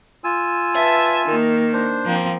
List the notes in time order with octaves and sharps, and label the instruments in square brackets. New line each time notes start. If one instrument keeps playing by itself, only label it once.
[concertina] F4 G#5 E6
[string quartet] B4 E5 A5
D#3 A#3
[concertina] D4 C5
[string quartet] F3 A#3 C4